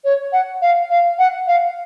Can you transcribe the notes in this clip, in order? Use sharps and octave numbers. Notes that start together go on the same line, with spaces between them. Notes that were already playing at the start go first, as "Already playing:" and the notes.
C#5
F#5
F5
F5
F#5
F5